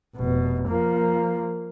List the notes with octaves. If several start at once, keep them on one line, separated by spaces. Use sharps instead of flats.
F1 B2
F3 A#3